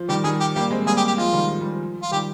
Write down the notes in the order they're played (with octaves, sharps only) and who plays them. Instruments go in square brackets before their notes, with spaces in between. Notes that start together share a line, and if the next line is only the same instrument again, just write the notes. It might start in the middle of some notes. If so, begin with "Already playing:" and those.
Already playing: [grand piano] F3
[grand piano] D#3 G3 [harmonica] G4
[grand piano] D#3 G3 [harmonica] G#4
[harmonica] G4
[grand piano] G3 A#3 [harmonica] G4
[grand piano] G#3 C4
[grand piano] G3 A#3 [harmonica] G#4
[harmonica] G4
G4
[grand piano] F3 G#3 [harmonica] F4
[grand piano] D#3 G3
F3
G3
F3
[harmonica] F4
[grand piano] D#3 G3 [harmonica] G4